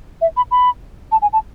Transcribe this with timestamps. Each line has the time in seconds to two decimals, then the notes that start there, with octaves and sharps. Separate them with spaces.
0.21 E5
0.37 B5
0.51 B5
1.12 A5
1.22 G#5
1.33 A5